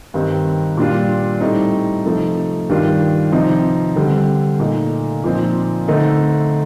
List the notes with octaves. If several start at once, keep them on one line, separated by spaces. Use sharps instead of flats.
G2 D#3 G3 C4 D#4
A#2 G3 D4 F4
A2 G3 C4 D#4
C3 F3 A3 D#4
G2 D#3 G3 D4 F4
C3 F3 C4 D#4
D3 G3 C4
A#2 A3 D#4
A#2 F3 C4 D#4
D3 A3 C4 D#4